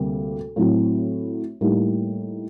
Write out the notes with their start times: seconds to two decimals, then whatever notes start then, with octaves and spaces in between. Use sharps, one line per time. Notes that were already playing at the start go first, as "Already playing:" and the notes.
Already playing: D2 C3 G3 A#3
0.56 A2 F#3 C4 F#4
1.61 A2 G3 A#3 D#4 G4